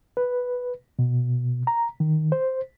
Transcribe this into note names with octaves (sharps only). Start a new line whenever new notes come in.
B4
B2
A#5
D#3
C5